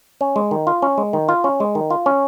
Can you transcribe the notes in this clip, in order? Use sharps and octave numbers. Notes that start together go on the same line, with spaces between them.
C#4
G#3
D#3
F4
C#4
G#3
D#3
F4
C#4
G#3
D#3
F4
C#4